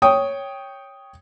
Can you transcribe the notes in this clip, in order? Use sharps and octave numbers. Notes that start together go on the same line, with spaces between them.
C#5 G5 D#6